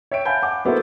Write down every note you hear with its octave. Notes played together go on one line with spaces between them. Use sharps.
C#5 E5 G5 D7
F5 F#5 G#5 A5 B5 G6
F#5 D6
A#3 B3 E4 F#4 A4 C5